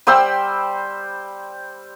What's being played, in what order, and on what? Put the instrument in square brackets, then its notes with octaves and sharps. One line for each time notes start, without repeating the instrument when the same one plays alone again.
[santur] G3 C5 G5 E6